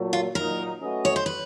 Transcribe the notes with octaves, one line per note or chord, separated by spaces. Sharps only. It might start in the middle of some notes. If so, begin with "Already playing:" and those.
Already playing: A#2 F#3 A3
F4
A#2 F#3 A#3 D#4 A#4
A3 C#4 F#4 B4 D#5
C#5
C5
B4